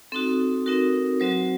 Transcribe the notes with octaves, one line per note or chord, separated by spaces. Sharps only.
C4 D#4 F#4 A4
C4 D#4 F#4 A#4
F#3 C4 F#4 C5